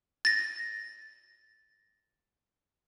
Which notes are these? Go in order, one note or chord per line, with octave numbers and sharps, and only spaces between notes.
A6 A#6